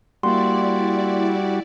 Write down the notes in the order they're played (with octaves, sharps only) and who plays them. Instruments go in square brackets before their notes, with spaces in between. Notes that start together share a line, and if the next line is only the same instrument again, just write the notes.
[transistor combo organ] G3 F#4 [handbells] A#3 C6 [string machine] E4 D5